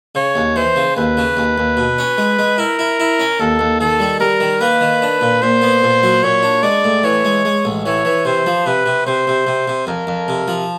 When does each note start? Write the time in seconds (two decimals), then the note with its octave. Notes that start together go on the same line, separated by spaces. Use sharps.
0.15 C#3 C#5
0.35 D#2
0.56 E3 C5
0.76 C#3
0.96 D#2 B4
1.17 C#3
1.37 D#2
1.58 D#2
1.77 B2
1.98 C#4
2.18 G#3
2.39 G#3
2.58 E4 A#4
2.79 E4
3.00 E4
3.20 C#4
3.40 D#2 A4
3.59 D#2
3.80 D#3 A4
4.00 G3
4.20 G3 A#4
4.40 D#3
4.61 A#3 B4
4.81 D#3
5.02 D4
5.21 A#2
5.42 A#2 C5
5.62 B3
5.83 A#2
6.03 F#3
6.23 A#2 C#5
6.43 D4
6.63 G#3 D5
6.84 A2
7.03 E3 C#5
7.25 G#3
7.45 G#3
7.65 A1
7.85 E3 C#5
8.05 E3
8.25 C3 C5
8.46 F3
8.66 C3 B4
8.86 C3
9.06 C3 C5
9.27 C3
9.47 C3
9.68 C3
9.87 F2 A#4
10.07 F2
10.28 C3
10.48 F3